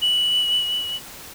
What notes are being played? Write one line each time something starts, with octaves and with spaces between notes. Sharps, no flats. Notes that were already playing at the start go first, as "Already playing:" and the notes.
F#7